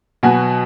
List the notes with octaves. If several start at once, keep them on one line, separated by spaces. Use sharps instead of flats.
B2 F#3 B3 F#5 G#5